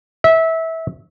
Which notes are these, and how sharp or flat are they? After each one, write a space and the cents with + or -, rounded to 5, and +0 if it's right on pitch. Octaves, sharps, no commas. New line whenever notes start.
E5 -20